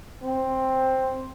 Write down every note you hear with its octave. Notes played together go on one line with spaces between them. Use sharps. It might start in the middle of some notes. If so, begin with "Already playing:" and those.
C4